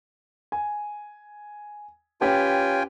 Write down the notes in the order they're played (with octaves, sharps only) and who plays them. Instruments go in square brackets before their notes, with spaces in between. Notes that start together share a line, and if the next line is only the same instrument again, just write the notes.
[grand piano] G#5
[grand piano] C#4 G4 B4 [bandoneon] F4 G5 G#5